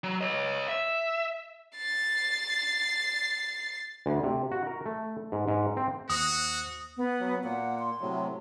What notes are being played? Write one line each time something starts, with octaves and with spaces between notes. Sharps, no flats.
F#3
C#5 D#5
E5
A6 C7
D2
C3
F#4
A#4
A3
G#2
G#2
C4
D#2 F#4 C5 D#6 F#6
B3
F#3
A#2 A#3 F#5
C6
A2 C3 F#3